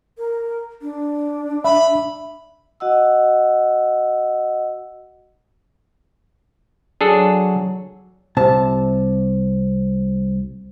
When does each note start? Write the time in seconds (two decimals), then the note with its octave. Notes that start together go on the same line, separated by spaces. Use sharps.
0.18 A#4
0.82 D4
1.64 E5 B5
2.80 F#4 D#5 F#5 E6
7.01 F#3 D4 G#4 A4
8.37 C2 C3 C5 A5